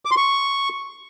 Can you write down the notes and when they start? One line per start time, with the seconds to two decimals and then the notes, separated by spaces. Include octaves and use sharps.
0.05 D6
0.11 C6
0.17 C#6